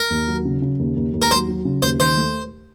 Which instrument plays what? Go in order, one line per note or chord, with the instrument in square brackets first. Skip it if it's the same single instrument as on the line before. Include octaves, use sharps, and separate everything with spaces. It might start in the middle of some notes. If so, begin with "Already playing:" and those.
Already playing: [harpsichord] A#4
[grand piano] D#2
F#3
C#3
C#3
D#2
D#2
D#2
[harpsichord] A#4
[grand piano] F#3 [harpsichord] C5
[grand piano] F#3
C#3
[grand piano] D#2 [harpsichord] C5
[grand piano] D#3 [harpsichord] C5
[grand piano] A3